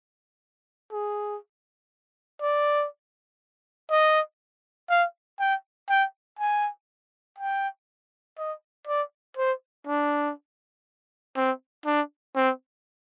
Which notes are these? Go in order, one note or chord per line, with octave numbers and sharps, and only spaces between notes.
G#4
D5
D#5
F5
G5
G5
G#5
G5
D#5
D5
C5
D4
C4
D4
C4